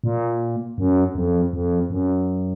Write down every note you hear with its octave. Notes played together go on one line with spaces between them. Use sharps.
A#2
F#2
F2
F2
F#2